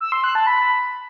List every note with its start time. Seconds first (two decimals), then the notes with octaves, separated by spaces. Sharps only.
0.01 E6
0.12 C6
0.24 F#6
0.35 A5
0.47 B5